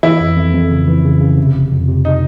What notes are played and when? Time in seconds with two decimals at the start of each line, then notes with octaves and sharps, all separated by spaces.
0.03 E3 E4
0.20 F2
0.37 F2
0.54 F2
0.71 C#3
0.88 E3
1.05 C#3
1.21 C#3
1.37 C3
1.54 G1
1.72 F2
1.88 C3
2.05 D#4